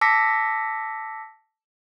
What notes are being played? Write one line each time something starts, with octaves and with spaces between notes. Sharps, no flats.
A5 D6 E6 A#6 B6 C#7